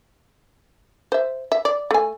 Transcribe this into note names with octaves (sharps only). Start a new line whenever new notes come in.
C5 E5
E5
D5
A3 G#5